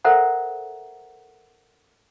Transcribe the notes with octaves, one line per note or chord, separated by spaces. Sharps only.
A4 A#4 C5 E5 F#5 A#5